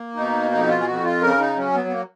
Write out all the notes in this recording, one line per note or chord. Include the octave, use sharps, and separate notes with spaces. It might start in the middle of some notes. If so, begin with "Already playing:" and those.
Already playing: A#3
B2 D#4
F2 D#4
F4
G#4
F2 F#4
F4
C#3 A#4
D#4
F#3 C#4
B3
B3
A#3